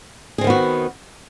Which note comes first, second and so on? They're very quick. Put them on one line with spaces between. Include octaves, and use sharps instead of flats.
G#4 C4 D#3 B3 F#4